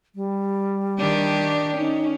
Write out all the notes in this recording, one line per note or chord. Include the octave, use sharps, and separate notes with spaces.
G3
D#3 D4 G4
C#4 D#4